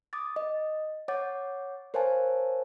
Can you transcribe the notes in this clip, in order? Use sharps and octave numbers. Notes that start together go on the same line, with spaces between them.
D6 D#6 A6
D#5
C#5 F#5 D6 G6 A6
A#4 C5 C#5 F5 G#5 A5